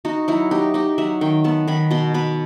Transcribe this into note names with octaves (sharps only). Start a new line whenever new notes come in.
D#4 F#4
F#3 E4
D#4 G4
D#4 G4
F#3 E5
D#3 G5
B3 A5
D#3 B5
B2 C6
B2 B5